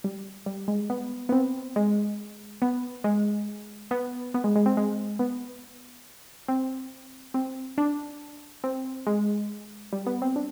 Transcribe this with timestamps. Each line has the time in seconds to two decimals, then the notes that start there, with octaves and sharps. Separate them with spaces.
0.04 G3
0.46 G3
0.68 G#3
0.90 B3
1.29 B3
1.32 C4
1.76 G#3
2.62 B3
3.04 G#3
3.91 B3
4.34 B3
4.44 G#3
4.55 G#3
4.66 C4
4.77 G#3
5.19 B3
6.48 C4
7.34 C4
7.78 D4
8.64 C4
9.07 G#3
9.93 G3
10.06 B3
10.22 C4
10.36 D4